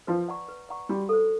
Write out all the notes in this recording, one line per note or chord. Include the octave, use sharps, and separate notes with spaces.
F3 B4
D5 F#5 A#5 C#6
B4
D5 F#5 A#5 C#6
G3 F#4
A4 C5